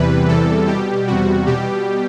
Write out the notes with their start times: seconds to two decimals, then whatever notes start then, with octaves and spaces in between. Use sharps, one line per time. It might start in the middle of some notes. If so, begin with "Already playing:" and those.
Already playing: E2 C3 E3 G3 B4
0.28 E2 C3 E3 G3 A4
0.67 B2 G3 G4
1.07 E2 C3 G3 F#4
1.46 B2 G3 G4